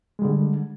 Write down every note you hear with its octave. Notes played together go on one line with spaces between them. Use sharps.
D3 G3 G#3